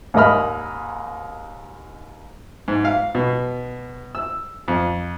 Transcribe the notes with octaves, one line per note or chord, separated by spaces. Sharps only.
D#2 G#2 A#4 D#5 B5 F6
G#2
F5
B2
E6
F2